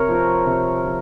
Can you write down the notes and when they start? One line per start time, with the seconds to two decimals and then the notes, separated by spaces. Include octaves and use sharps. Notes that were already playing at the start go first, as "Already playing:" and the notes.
Already playing: C3 A#4 C#5
0.09 F3 C4
0.46 C3
0.85 F3